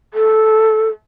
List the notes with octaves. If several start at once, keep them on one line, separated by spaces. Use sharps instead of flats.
A4